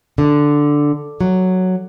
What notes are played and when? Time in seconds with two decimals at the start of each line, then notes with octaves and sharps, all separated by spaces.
0.18 D3
1.21 F#3